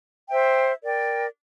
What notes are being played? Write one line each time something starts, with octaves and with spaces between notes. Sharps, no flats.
C5 E5 G5
A#4 D5 G5